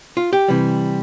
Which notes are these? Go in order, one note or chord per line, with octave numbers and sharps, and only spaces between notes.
F4
G4
C3 E3 G3